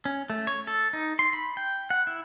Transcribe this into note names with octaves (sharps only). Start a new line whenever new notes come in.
C#4
A3
C#5
A4
D#4
C6
B5
G5
F#5
E4